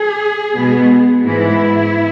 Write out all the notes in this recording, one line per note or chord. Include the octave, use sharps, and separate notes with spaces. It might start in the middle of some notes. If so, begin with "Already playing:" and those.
Already playing: G#4
B2 G#3 B3
G#2 E3 G#3 B3 E4